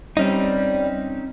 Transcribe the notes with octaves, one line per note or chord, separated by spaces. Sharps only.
G3 C4 C#4 D#4